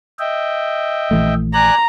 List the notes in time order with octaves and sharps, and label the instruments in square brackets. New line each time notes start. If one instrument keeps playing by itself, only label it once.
[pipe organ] D#5 E5 G5
[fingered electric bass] A#1 E3 A3
[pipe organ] D5 G#5 F#6 [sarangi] A#5